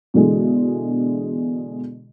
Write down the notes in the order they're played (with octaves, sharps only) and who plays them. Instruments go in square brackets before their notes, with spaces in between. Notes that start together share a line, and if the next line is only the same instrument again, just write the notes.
[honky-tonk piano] B2 D3 E3 G#3